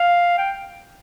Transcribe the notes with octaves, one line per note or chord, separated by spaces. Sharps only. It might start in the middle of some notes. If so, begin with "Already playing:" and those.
Already playing: F5
G5